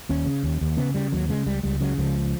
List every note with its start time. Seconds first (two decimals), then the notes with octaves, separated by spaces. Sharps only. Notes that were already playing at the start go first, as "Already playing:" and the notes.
0.09 D#2 C#4
0.26 C#3
0.43 D#2
0.61 D#2
0.77 C#3 B3
0.94 C#3 G3
1.12 D#2 F#3
1.29 C#3 G#3
1.46 C#2 G3
1.63 C#2 G3
1.81 C#3 F#3
1.98 C#2 F3